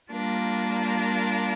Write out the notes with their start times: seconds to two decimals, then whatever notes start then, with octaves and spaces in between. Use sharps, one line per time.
0.11 G3 A#3 D4 F4 A#4